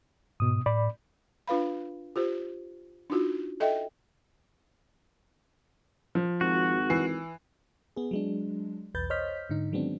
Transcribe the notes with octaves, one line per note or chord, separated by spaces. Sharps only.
G#2 B2 D#6
A2 D5 B5
D4 F4 B4 F5 B5
F4 G4 C5
D4 D#4 F4 F#4
A4 D#5 E5 G5
F3
G#1 F#4
E3 C7
B3 G#4
F#3 G#3 D4
B1 E2 B4 G6 A6
C5 C#5 D#5 F6 G6 B6
G#2 D3 D#4
D#3 F#3 G#3 B3 C4 D4